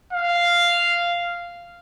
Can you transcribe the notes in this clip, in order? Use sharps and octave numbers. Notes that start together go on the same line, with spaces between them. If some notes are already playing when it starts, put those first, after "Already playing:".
F5